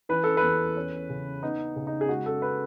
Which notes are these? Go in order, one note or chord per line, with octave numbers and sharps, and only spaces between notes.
E3 B4
A4
B4
E2
C#4
C#3
B3 D#4
C#3
D#4
G#4
G#3 F#4
A4
B4